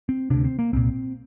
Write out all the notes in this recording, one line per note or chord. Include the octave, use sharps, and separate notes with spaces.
C4
D2 C3 D4
C4
A#3
C2 A#2 C4